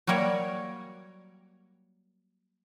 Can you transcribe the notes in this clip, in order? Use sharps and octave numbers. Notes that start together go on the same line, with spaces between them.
F#3 G3 A#3 A#4 C#5